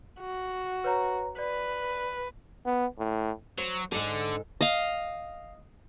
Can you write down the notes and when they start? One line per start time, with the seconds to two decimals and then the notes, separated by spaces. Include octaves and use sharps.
0.20 F#4
0.84 B4 C#5 A#5
1.39 B4 D5
2.65 B3
2.98 A2
3.58 F#3 C5
3.92 G#2 D3 A4
4.61 D#5 F5